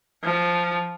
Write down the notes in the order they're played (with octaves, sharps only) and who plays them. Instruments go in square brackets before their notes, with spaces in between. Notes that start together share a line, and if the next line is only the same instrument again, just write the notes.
[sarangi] F3